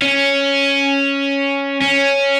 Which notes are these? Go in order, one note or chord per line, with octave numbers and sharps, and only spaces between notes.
C#4
C#4